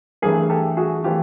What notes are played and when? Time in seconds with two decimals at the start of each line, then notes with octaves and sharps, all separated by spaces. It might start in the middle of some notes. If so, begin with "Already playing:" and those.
0.22 G2 E3 A3 G#4 A#4
0.50 G4 A4
0.77 F#4 G#4
1.04 E3 A3 F4 G4